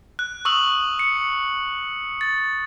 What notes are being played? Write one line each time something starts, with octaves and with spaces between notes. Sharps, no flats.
F#6
C#6 D#6 E6 F#6 F#7
C#7
A6